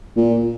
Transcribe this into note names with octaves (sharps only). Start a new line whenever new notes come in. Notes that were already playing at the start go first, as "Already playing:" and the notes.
A#2